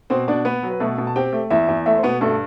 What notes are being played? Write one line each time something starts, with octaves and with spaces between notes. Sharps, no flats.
B2 C4 C5
B2 D4 D5
B3 B4
F#3
B4
B2 A3 A4
B2
A5
C4 G4 G5
A3
E2 E4 E5
E2
A3 E4 E5
C5
B2 B3 B4
G2 A3 A4